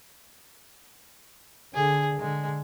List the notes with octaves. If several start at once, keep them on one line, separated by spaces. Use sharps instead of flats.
D3 G#4
D3 G#3